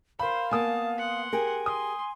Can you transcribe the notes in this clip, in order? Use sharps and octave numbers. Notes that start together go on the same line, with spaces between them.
A#4 C5 F5 B5
A#3 B3 G#5 A5 D#6
F#5 C6
G4 G#4 A#4 G#5
C6 D#6